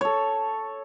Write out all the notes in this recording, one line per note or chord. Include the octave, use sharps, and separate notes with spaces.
A4 C#5